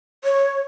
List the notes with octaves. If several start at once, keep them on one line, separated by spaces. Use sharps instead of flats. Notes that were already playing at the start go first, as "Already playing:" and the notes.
C#5